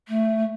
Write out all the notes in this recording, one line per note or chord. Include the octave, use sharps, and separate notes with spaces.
A3